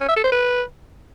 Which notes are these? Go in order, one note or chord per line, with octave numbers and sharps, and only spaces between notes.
C#4
E5
A4
C5
B4